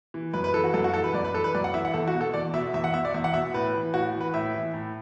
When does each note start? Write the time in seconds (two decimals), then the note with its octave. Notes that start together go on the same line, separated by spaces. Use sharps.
0.14 E3
0.33 F#2 B4
0.44 B4
0.54 E3 A4
0.64 F#4
0.74 F#2 A4
0.84 F#4
0.94 E3 A4
1.04 B4
1.14 F#2 D5
1.25 B4
1.34 E3 A4
1.44 B4
1.55 F#2 D5
1.64 F#5
1.74 E3 E5
1.85 F#5
1.94 E2 A4
2.08 F#4
2.14 B2
2.21 A4
2.34 E2 D5
2.54 B2 E5
2.74 E2 E5
2.84 F#5
2.94 B2 E5
3.05 D5
3.14 E2 E5
3.24 F#5
3.34 B2 E5
3.54 A2 B4
3.74 E3
3.94 A2 F#4
4.15 E3
4.21 B4
4.34 A2 E5
4.54 E3
4.74 A2